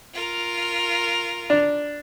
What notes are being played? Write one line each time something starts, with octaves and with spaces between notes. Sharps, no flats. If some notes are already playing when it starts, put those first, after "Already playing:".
F4 A#4
D4